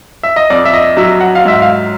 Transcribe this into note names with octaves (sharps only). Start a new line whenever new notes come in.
E5
D#5
F2 D5
E5
D#5
F#3 E5
F#5
F5
G#2 E5
F5